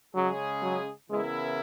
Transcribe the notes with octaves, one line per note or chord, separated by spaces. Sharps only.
C#3 F#3 G#3 C#4 G#4
F#3
C#3 E3 G#3 B3 E4 A#4